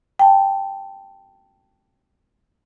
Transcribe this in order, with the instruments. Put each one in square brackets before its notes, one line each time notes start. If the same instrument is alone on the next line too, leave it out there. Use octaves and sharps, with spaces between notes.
[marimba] G5 A5